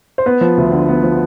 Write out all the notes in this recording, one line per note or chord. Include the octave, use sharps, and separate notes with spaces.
C5
B3 B4
F3
D2
D3
B3
F3